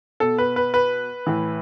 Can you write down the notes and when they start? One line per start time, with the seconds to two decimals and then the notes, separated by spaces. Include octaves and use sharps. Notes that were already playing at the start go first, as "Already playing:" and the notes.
0.20 B2 A4
0.38 B4
0.56 B4
0.74 B4
1.27 A2 E3